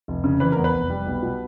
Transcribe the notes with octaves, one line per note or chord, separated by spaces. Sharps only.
F1
C#3
E3 B4
E2 A#4
B4
F1
G3
B1
B2